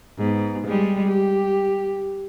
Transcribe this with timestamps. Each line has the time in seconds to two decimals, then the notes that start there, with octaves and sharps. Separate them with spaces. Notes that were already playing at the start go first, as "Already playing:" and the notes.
0.18 G#2 B3
0.67 G3 G#3 G4
1.07 G4